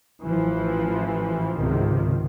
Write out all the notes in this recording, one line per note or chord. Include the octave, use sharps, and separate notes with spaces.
A1 E3 F3
G#1 C#2 C3 D#3 F3